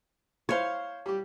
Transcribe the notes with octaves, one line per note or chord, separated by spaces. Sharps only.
E4 C5 C#5 F5
G3 G4